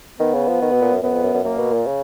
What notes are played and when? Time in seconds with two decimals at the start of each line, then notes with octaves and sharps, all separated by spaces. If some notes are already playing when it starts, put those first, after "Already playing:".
0.20 D#3 B3
0.34 C#3
0.48 F3
0.62 D#3
0.72 B2
0.82 A#2
0.92 F#2
1.03 F#2 B3
1.13 F2
1.23 F#2
1.34 F#2
1.44 F#2 A#3
1.58 B2
1.73 A#2
1.87 C#3